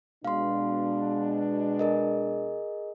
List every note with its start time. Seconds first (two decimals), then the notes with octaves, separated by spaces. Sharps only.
0.25 B2 G#3 D4 F5 C6
1.79 G#4 A#4 D#5